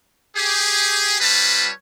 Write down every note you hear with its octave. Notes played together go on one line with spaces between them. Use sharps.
G4 G#4
G3 C4 F4 B4 C#5 A5